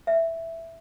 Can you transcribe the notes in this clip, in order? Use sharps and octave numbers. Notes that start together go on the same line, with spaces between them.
E5